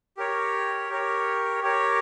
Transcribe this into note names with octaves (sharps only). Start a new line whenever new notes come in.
G4 A#4 C#5
G4 A#4 C#5
G4 A#4 C#5